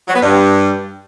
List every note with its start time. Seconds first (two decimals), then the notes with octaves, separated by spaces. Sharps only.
0.07 F#3
0.14 B3
0.21 G2